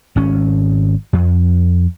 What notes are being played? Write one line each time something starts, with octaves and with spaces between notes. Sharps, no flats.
G#1 C#4
F2